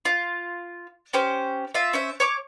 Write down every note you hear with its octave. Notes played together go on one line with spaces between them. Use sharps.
F4
C#4 G4 C5
F4 E5
C#4 C5 E5
C#5 C#6 D6